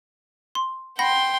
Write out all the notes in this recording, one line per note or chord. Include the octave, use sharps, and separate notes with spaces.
C6
F#5 G5 B5 C6 A#6